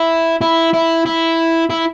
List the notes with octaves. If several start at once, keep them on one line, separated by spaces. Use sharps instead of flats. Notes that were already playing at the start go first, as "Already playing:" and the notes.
Already playing: E4
E4
E4
E4
E4